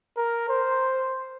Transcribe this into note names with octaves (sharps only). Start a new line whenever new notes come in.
A#4
C5